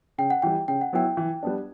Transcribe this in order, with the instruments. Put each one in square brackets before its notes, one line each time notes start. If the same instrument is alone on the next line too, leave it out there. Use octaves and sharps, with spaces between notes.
[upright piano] C#3 [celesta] G5
[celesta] F#5
[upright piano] E3 G3 [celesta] G5
[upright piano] C#3 [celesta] G5
[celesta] F#5
[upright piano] F#3 B3 E4 [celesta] G5
[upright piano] E3
G3 B3 D4